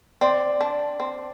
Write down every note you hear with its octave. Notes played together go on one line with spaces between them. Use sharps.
C4 D5
D4
C4